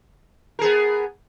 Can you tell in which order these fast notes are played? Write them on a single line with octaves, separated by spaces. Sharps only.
A#4 G#4 B3